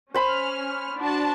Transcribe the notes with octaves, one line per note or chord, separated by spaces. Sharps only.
C#4 C5 B5 F6
D4 F#4 A5